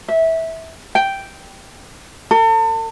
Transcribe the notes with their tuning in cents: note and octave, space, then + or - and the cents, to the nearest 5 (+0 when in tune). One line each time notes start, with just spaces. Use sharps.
E5 -20
G5 -5
A4 +40